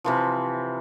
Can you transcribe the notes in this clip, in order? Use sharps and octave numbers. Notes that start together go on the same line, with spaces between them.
C3 E3 F3